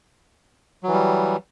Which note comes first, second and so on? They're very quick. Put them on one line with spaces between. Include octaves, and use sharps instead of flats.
F#3 E3 G3